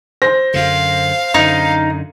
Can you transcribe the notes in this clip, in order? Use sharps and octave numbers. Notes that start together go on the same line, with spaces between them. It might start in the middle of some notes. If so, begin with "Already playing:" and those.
C5 A#6
F#2 D3 F5
F#2 D3 D#4